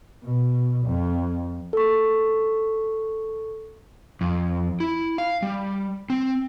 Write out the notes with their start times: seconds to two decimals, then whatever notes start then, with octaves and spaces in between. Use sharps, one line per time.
0.24 B2
0.86 F2
1.73 A4 C#6
4.21 F2
4.80 E4
5.18 F5
5.42 G3
6.10 C4